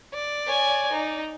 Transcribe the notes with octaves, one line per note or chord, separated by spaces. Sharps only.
D5
C#5 G#5
D#4